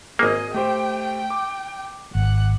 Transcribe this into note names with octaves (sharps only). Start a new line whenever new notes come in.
G#1 A#3 G#4 D#5
A3 G4 C5 G5
D6
G#1 F#5